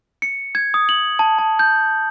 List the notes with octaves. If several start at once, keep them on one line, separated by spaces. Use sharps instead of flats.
C#7
G#6
D#6
F#7
A5
A5
G6